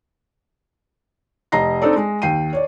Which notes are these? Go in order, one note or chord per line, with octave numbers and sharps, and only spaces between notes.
F1 D#5 A#5 A#6 C7
C4 D4 D#4 A4 D5
G#3
D#2 G5 C7 D#7
C#5 D5